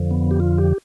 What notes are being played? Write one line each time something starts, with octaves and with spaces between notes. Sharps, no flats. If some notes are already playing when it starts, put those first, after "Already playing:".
Already playing: F2 D3 F3
B3
G4
F4
G4